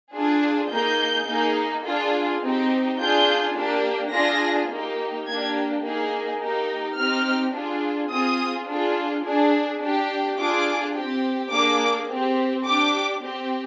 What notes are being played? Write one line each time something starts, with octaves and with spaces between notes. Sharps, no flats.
D4 F4 G#4
A#3 D#4 G#4 G6
A#3 D#4 G#4
D4 F4 G#4
C4 D#4 G4
D4 F4 G#4 G6
A#3 D4 G4
D4 F4 G#4 A#6
A#3 D#4 G4
A#3 D4 G4 G#6
A#3 D#4 G#4
A#3 D#4 G4
C4 D#4 G4 F6
D4 F4 G#4
C4 F4 G#4 D#6
D4 F4 G#4
D4 G#4
D4 G4
D4 F4 G#4 D6
C4 G4
A#3 D4 G#4 D6
C4 G4
D4 G4 D6
C4 G4